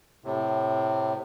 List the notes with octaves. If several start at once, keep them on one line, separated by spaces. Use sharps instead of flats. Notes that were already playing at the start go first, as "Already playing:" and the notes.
A2 C3